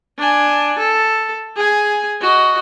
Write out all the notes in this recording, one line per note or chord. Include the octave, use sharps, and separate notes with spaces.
D4 G#5
A4
G#4 G#5
F#4 D#5